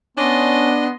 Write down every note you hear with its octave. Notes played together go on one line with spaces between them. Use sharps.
B3 C#4 D4 D#5 C6